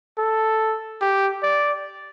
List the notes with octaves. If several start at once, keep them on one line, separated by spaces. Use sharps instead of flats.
A4
G4
D5